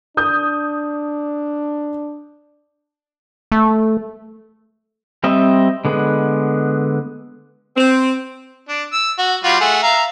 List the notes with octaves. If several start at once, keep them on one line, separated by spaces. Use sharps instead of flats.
D4 D#6 G6
A3
G3 C4 D#5 E5
D3 G#3 B3
C4
D4
E6
F#4
G3 F4 F#4
A3 G#4 F#5
E5 F5 A#5